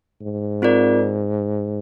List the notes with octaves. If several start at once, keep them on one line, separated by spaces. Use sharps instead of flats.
G#2
C4 F4 A#4 D5